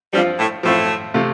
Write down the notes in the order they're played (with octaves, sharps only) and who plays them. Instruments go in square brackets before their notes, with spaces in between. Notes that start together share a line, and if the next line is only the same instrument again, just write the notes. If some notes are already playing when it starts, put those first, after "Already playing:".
[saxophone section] G2 G3 [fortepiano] F3 C4 F4
[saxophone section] A2 A3
[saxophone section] A2 A3 [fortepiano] F3 C4 F4
[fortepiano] C3 A3 F4